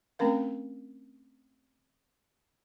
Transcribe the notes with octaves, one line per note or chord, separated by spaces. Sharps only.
A3 C4 C#4 A#4 F5